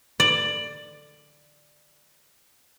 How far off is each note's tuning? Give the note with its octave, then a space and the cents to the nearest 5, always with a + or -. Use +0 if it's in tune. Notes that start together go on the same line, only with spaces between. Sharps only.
D5 +15